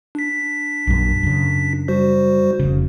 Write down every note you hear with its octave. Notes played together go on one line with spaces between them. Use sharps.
D4 B6
A#1 F#2
F#2 C#3
G3 F#4 C5
F1 C#3